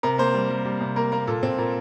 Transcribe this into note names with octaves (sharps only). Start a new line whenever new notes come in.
C3 A#4
A#3 C5
G3
G3
G3
C3
A#3 A#4
A#3 A#4
A#2 A4
A#2 C4
A#2 A#4